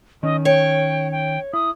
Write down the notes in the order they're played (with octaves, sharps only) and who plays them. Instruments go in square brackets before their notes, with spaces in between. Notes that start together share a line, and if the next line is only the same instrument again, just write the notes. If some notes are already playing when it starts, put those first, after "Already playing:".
[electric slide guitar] D#3 C#4 [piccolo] D#5
[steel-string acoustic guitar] C#5 [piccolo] G5
[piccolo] G5
[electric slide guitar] E4 [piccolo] D#6